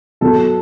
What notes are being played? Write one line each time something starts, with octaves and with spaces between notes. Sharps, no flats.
B2 F#3 A4